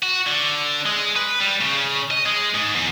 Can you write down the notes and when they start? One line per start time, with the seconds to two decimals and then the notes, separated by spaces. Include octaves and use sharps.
0.03 F#4
0.27 D3
0.86 G#3
1.16 B4
1.41 G3
1.61 C#3
2.11 D#5
2.26 G#3
2.54 G#2
2.76 E2